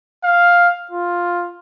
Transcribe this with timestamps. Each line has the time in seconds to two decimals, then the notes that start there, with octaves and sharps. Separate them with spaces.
0.24 F5
0.91 F4